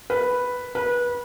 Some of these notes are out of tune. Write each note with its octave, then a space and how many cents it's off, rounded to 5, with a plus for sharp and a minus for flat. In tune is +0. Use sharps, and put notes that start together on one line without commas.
B4 +0
B4 -25